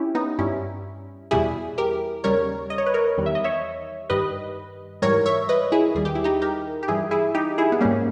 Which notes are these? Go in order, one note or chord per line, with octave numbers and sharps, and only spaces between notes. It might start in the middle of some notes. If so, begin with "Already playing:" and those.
Already playing: C#4 E4 G4
B3 D#4
G2 G3 C#4 E4
E2 B2 G3 E4 G#4
G4 A#4
D#2 C#3 G3 A#4 C#5
D#5
C#5
B4
A#4 C#5
E2 D#3 G3
E5
D#5
C#5 E5
G2 D#3 G3 B4 D#5
G#2 E3 G3 A#4 C#5
C#5 E5
B4 D#5
E4 G#4
D#2 D#3 G3 G#4
G4
E4
D#4 G4
G4 A#4
G4
G2 E3 G3 E4 G#4
E4 G#4
D#4 G4
E4 G#4
B3
G#2 G3 A#3 C#4